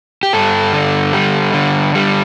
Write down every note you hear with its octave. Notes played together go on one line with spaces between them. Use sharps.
G4
G2 A4
D3
G3
D3
G3